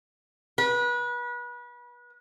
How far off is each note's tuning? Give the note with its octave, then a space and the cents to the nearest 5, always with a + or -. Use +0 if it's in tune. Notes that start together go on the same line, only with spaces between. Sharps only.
B4 -30